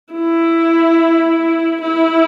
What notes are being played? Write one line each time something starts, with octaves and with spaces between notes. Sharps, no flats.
E4
E4